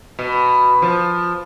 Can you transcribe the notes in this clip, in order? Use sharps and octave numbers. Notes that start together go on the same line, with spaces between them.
B2
F3